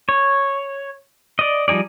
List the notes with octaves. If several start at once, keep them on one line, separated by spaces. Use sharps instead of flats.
C#5
D5 D#5
F3 G3 D#4 G#4 D5